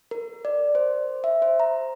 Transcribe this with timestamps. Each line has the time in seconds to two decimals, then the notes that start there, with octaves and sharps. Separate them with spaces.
0.11 A#4
0.45 D5
0.75 C5
1.24 E5
1.42 C5
1.60 A#5